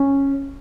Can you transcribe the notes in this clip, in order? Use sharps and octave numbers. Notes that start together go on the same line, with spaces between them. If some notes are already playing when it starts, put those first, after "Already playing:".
Already playing: C#4